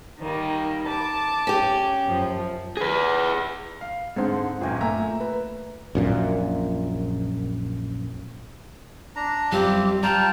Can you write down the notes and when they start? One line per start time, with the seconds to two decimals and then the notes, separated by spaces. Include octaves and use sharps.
0.20 D#3 G3 A#3
0.85 A5 D6
1.47 C#4 G4
2.05 F#2 F3
2.77 G#4 B4
3.81 F5
4.16 G#2 D3 G#3 C4 C5
4.61 G1 F#2 A#2 F4 G5 G#5
4.81 A3 A#3 E5 G#5 A#5
5.21 B4
5.95 A#1 F#2 A#2
9.16 D4 A#5
9.52 F#2 G3 C4 F4 G4
10.03 G3 F4 G5 A5 A#5